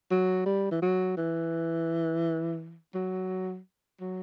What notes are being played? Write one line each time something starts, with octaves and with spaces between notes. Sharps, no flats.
F#3
G3
E3
F#3
E3
F#3
F#3